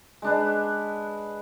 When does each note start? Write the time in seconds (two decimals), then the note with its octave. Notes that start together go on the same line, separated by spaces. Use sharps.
0.22 G#3 D4 B4